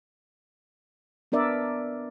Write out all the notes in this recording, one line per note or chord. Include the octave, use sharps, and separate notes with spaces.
B3 D4 A#4 D5 E5